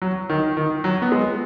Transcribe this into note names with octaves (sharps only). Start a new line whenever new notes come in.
F#3
D#3
D#3
F#3
B3
G#3